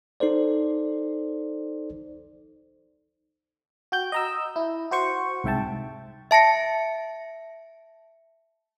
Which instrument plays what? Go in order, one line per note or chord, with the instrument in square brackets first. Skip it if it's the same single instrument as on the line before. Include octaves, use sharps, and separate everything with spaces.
[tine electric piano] D#4 A4 C5 D5
[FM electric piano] F#4 G5 G6
D#5 A#5 E6
E4
F#4 C5 C#6
C2 G#2 E5 G5 A5
[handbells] E5 A5 A#6 C#7